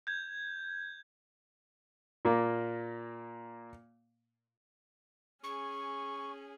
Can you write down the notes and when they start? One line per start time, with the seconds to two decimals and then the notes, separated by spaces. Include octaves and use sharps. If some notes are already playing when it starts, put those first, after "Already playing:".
0.07 G6 G#6
2.25 A#2 A#3
5.44 C#4 G#4 C#6